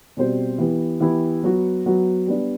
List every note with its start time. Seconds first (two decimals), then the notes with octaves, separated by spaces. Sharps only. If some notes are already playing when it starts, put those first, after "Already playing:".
0.17 B2 G3 C4 F#4 C5
0.58 E3 B3 E4 G4
1.00 E3 B3 E4 G4
1.43 F#3 B3 F#4
1.86 F#3 B3 F#4
2.27 G3 B3 D4